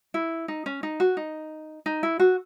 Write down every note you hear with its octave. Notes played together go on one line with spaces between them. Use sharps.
E4
D#4
C#4
D#4
F#4
D#4
D#4
E4
F#4